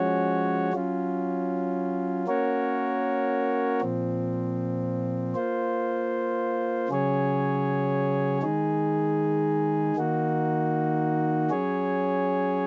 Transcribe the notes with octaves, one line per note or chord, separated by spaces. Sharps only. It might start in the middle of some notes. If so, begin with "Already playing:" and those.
Already playing: F3 G#3 C#4 F#4 C#5
F#3 C#4 F4
A#3 C#4 F#4 A#4 C#5
A#2 F3 C4
A#3 F4 C5
C#3 F#3 C#4 G#4 C#5
D#3 G#3 D#4 G#4
D#3 A#3 D#4 F#4
F#3 C#4 G#4 C#5